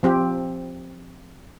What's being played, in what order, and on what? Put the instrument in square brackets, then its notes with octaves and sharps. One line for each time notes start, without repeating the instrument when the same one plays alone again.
[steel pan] F3 C4 G4